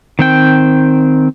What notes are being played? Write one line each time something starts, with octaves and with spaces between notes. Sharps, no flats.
D#3 C4 G5